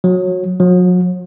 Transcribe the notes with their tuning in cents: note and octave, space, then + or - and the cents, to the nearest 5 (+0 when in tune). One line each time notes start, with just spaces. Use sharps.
F#3 -20
F#3 -40